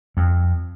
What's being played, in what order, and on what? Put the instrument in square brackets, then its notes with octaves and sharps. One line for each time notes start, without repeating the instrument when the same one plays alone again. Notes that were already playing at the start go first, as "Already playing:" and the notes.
[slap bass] F2